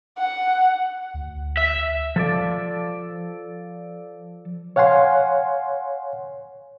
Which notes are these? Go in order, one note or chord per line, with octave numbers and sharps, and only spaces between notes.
F#5
D2
E5
F3 A4 D5
C#5 F5 F#5 G#5 C6